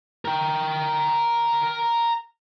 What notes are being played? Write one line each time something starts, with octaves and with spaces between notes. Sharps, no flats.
A#4 G5